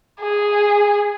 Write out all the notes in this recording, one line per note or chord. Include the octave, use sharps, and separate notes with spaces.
G#4